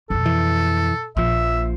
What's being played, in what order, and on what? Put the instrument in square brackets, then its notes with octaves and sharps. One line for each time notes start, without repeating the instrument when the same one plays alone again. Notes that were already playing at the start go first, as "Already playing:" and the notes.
[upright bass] F2 B2 [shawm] A4
[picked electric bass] E3
[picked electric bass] A#1 F3 [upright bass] A#2 [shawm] E5